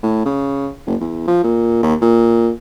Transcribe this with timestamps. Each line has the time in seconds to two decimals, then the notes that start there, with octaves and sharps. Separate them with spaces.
0.03 A2
0.25 C#3
0.86 F#1
1.00 E2
1.28 F3
1.44 A#2
1.83 D#2
2.02 A#2